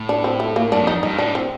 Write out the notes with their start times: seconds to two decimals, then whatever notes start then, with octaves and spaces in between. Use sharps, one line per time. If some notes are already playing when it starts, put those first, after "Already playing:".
Already playing: A2
0.09 D4
0.24 C4
0.40 A3
0.56 A#3
0.72 G2 D4
0.82 F2
0.87 D#4
1.03 G2 D#4
1.18 A2 D4
1.35 C4